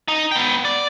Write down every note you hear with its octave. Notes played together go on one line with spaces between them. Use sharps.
D#4
B3 G5
D5